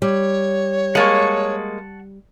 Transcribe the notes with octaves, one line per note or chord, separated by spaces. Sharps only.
G3 C#5
G#3 A#3 F#5 A5 C#6